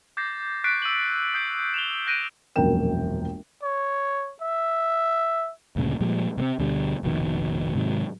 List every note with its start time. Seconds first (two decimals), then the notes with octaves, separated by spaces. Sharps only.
0.17 D6 G6 A6 A#6 C7
0.64 C#6 F#6 A6 B6 C7 D7
0.82 E6 D#7 F#7
1.34 D#6 G6 C7 D7 F#7
1.74 E7 F7 G7
2.06 F#6 G6 A#6 D7 D#7
2.56 E1 A#1 F#2 A#4 G5 E7
3.63 C#5
4.42 E5
5.76 D2 G2 A#2 C#3
6.01 A#2 F3 G3 G#3
6.37 C3 A#3 C4
6.59 D2 B2 D3 G3
7.03 F1 A#1 B2 D#3
7.75 G#2 C3 D#3 F#3